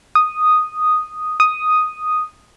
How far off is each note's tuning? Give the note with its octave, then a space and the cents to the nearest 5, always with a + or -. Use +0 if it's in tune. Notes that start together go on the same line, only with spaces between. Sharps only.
D#6 -5
D#6 +0